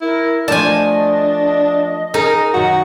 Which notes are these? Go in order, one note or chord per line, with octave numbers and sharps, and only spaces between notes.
E4 A#4
F3 A3 D4 D5 D#5 G#5 A5
D#4 G#4 A#4
F#2 D#3 F#4